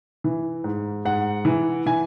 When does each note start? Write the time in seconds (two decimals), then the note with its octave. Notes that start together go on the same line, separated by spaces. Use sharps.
0.24 E3
0.64 G#2
1.05 G#2 F#5
1.45 E3
1.86 E3 G#5